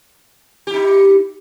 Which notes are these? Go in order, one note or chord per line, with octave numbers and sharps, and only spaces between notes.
D#4 E4 G4